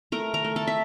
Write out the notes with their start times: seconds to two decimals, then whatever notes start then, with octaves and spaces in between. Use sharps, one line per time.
0.12 A3 A#4 A#5
0.34 A#4 A#5
0.45 A3
0.56 A4 A5
0.67 E5